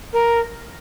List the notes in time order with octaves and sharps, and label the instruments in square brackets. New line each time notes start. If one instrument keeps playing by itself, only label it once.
[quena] A#4